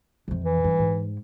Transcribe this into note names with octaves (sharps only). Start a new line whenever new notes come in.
F2 C3
E3
G2
G#2